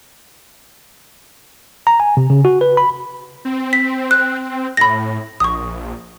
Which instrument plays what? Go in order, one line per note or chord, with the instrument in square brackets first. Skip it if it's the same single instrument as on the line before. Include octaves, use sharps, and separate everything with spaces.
[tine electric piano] A#5
G#5
C3
C#3
F#4
B4
B5
[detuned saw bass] C4
[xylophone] B6
F#6
[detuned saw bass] A2 [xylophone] B5 A#6
[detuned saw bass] A#1 [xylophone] C#6 D#6